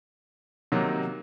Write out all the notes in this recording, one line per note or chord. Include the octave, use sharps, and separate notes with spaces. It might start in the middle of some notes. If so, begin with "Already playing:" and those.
C3 D#3 F#3 A#3